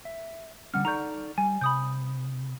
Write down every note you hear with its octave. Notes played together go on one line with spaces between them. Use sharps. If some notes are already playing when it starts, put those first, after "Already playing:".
E5
D3 G3 C#4 F#5 F6
D#4 A4 D5 A#5 C#6 G6
G3 G#5
C3 B5 D#6 G6